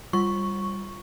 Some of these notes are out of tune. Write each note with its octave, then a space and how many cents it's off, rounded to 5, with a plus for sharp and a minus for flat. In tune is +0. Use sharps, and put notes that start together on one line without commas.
G3 +0 F4 +0 C#6 +0